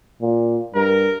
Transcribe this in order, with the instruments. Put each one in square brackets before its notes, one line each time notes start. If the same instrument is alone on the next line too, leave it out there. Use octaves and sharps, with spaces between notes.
[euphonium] A#2
[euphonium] G2 [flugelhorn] A#4